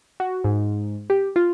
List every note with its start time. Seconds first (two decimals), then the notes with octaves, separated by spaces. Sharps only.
0.20 F#4
0.44 G#2
1.10 G4
1.36 F4